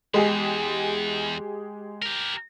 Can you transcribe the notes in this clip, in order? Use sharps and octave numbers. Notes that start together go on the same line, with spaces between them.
E2 G#3 G4 G#4
G4 A#4